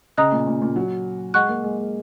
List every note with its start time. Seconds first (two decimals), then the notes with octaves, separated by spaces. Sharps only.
0.17 C#3 D#5 A#5 D#6 F#6
0.32 A#2
0.47 A#2
0.62 A#2
0.76 F#3
1.34 G#3 D#5 F#5 C#6 F#6
1.49 A#3
1.64 G#3
1.78 G#3